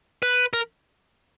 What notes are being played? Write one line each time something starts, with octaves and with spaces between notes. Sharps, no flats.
B4
A#4